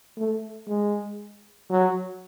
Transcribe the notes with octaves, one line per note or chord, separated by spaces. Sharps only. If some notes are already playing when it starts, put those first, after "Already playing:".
A3
G#3
F#3